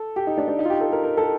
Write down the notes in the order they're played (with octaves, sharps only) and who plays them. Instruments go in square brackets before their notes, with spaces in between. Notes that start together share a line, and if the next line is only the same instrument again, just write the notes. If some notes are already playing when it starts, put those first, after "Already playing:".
Already playing: [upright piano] A4
G4
D#4
D4
D4
D#4
F4
G4
A4
A#4
A#4
A4